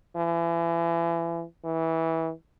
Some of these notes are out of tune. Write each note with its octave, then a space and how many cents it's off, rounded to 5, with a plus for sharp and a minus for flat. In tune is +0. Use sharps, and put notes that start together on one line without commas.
E3 +35
E3 -20